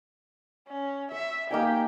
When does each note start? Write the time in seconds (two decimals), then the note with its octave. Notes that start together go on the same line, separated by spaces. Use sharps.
0.68 C#4
1.12 E5 C#6
1.51 A#3 D#4 G4 G#5